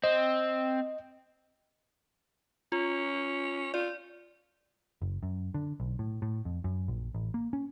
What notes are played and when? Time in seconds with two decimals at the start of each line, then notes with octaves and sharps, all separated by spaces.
0.04 C4 D#5
2.72 C#4 F4
3.74 F4 D5
5.02 F#1
5.23 F#2
5.54 D3
5.80 B1
5.99 A2
6.22 A2
6.45 F2
6.64 F#2
6.88 A#1
7.15 A1
7.34 A#3
7.53 C#4